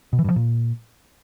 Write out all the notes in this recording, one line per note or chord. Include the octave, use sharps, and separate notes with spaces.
B2
E3
G2
F3
A#2